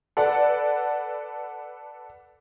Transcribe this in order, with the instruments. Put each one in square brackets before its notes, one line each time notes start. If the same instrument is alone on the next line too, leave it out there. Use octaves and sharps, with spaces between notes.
[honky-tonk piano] A4 B4 D5 F#5